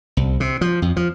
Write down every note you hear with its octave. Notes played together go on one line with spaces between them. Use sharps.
C2
C3
F3
F2
F3